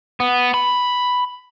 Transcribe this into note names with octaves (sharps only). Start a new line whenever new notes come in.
B3
B5